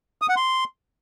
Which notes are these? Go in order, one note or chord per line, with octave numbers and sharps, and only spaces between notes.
D#6
F#5
C6